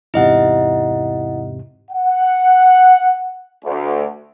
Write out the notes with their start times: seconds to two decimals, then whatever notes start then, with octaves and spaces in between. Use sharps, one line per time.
0.14 E2 G#2 C3 E4 D#5 F#5
1.91 F#5
3.65 D2